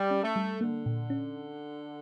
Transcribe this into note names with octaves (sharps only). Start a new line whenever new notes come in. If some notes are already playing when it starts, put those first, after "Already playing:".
Already playing: G3
C#4
A3
G3
D3 A#3
A#2
C#4